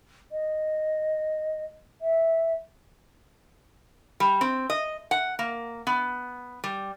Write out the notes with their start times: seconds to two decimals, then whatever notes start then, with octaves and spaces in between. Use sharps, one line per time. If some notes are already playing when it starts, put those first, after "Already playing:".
0.31 D#5
2.01 E5
4.20 G3
4.41 C4
4.70 D#5
5.11 F#5
5.39 A#3
5.87 B3
6.64 G3